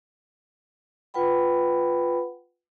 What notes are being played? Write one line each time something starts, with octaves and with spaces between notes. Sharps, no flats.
F4 B4 F#5 G5 B5